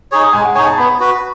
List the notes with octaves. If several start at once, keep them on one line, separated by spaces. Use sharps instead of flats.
D#4 G#4 C#5
G#3 G#5
F#5
D#4 G#4 C#5 G#5
A5
B3 B5
F#4 B4